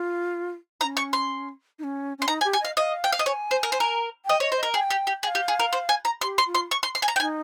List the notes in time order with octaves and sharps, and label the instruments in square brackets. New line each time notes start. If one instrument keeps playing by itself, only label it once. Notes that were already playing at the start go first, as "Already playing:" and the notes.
Already playing: [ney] F4
[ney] D#4 [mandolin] A#5
[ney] C#4
[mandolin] C#6
C6
[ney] D#4
C#4
[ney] C#4 [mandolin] C6
[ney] D#4 [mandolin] A#5
[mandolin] G#5
[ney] G4
[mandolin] G#5
[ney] D#5 [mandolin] F5
[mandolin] D#5 [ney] F5
[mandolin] G5
F5
D#5
[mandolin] C#5 [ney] G#5
[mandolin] C5
A#4
C5
A#4
[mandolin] D#5 [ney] G5
[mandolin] C#5 [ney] D#5
[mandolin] C5
[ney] D#5
[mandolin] A#4
[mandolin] G#4 [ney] G5
[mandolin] G4
G4
[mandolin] G#4 [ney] G5
[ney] F5
[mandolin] G4
G#4
A#4
C5
G#5
A#5
[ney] G4 [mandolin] C6
[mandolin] C6
[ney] F4
[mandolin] C6
C#6
C6
C6
G#5
A#5
G5
[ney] D#4 [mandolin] G#5